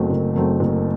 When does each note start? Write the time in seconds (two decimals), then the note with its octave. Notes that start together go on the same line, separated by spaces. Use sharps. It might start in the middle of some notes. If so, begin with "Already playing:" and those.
Already playing: F#1 F#2 F#3 A3 C4
0.10 F#1
0.35 F#2 F#3 A3 C4
0.60 F#1